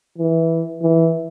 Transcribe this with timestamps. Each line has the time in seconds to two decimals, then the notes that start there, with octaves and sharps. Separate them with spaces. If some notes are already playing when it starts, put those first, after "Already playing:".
0.18 E3
0.82 E3